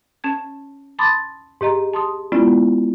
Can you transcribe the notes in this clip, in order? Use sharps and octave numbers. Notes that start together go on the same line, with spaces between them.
C#4 A5 G#6
A5 B5 C6 D6 D#6 A6
G#2 G4 D#5 A#5
A5 C6 D#6
G#3 B3 C#4 E4 F4 D5